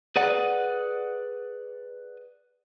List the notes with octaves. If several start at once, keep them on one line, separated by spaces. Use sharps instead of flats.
G#4 B4 D5 F#5